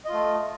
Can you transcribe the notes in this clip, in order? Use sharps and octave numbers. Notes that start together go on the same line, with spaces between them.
A3 F4 D#5